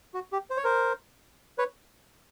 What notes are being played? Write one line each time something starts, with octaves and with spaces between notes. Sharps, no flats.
F#4
G4
C5
C#5
A#4 C5
B4 C#5